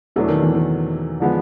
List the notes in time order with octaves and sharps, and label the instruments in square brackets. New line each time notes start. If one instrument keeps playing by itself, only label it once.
[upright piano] E2 E3 [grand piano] B2 F#3 A3 D4
[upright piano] D#3
E2 E3
D#3
[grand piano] D3 F3 G#3 B3